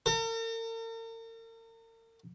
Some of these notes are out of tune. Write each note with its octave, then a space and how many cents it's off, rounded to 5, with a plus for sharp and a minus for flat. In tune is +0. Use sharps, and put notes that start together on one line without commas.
A#4 -45